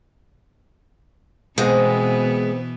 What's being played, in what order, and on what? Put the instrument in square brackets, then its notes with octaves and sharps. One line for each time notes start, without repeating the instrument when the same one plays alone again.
[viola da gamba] B2 E3 B3 [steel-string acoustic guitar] G#3 [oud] C4 F#4 G#4